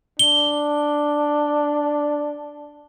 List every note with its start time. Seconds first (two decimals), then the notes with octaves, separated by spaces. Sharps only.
0.19 D4 G7